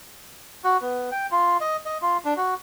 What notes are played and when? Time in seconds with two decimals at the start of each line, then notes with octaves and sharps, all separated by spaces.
0.64 F#4
0.81 B3
1.12 G5
1.31 F4
1.61 D#5
1.86 D#5
2.02 F4
2.25 D4
2.37 F#4